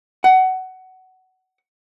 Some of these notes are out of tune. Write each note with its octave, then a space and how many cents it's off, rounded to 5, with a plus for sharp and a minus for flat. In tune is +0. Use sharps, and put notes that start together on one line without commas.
F#5 +20